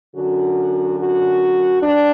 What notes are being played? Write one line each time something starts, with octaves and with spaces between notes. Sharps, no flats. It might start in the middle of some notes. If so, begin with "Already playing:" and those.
F#2 D3 F#4
F#4
G2 D4